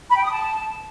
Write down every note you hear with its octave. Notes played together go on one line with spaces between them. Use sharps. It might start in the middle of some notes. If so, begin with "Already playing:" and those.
B5
G5
D#6
A5